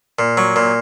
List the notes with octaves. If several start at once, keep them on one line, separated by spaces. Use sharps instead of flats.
A#2
F#3
A#2